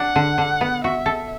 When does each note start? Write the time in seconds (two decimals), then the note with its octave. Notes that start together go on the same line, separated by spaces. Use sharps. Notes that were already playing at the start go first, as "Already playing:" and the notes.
Already playing: D4 F#5
0.16 D3
0.38 D3
0.61 B3
0.83 F#4 E5
1.06 A4